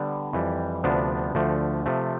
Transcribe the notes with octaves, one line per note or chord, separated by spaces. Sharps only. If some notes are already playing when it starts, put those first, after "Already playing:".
Already playing: D3 G3 B3
F2 E3 G3
D2 C3 F3 B3 D4
D2 D3 F3 A3
C3 F3 A3